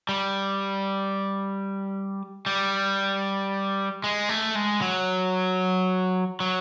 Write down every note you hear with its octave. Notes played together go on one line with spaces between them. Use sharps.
G3
G3
G#3
A3
G#3
F#3
F#3